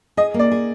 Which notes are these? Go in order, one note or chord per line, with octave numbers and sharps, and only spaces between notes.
G#4 D#5
A#3
D5
G#4